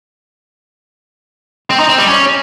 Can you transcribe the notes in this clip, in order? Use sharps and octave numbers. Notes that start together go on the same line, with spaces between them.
C4
D#4
C4
G3
C#4